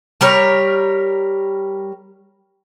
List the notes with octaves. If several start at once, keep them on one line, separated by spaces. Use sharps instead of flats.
G3 A#4 C#5